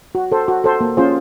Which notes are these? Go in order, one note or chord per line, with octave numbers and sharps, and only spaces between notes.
F#4
A4 C5
F#4
A4 C5
A#3
C#4 F4 G#4 C5